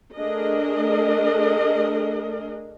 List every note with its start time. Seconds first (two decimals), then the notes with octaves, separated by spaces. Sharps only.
0.15 A3 D4 G#4 A#4 D#5